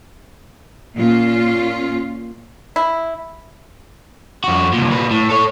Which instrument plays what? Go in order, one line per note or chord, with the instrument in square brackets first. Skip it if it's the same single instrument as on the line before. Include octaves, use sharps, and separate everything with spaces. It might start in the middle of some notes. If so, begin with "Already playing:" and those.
[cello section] A#2 C#4 F4
[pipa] E4
[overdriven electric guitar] F2 F#4
C2 A#2
A#2 B4
A2
A4 C#5